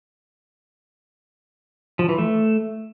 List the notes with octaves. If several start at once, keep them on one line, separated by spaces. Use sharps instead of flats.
F3
E3
A3